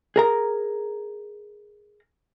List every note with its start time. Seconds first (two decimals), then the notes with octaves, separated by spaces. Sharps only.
0.16 G#4 A#4 A#5